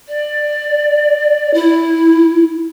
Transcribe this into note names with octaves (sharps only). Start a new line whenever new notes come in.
D5
E4